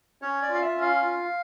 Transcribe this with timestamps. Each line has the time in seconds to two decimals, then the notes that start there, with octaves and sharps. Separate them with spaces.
0.22 C#4 C#5
0.42 D5
0.49 F4
0.54 F5
0.62 E5
0.76 C#4
0.82 F5
1.02 F4